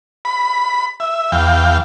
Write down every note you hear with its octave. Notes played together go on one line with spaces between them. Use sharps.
B5
E5
E2 F5 G5